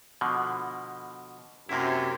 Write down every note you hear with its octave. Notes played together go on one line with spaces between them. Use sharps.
B2 D3 F3
F#2 C3 A#3 E4